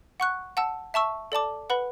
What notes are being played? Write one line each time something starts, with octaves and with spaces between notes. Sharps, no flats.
F#5 C#6 F#6
F#5 A5 E6
E5 A5 C#6 E6
A4 D5 A5 D6
B4 F#5 B5